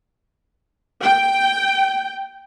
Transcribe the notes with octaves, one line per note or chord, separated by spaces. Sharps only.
G5